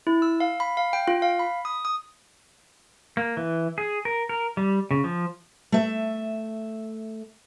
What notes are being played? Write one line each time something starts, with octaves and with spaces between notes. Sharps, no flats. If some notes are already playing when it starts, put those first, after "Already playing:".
E4
E6
F5
B5
F5
G5
F4
F5
B5
D#6
D#6
A#3
E3
G#4
A#4
A#4
G3
C#3
F3
A3 E5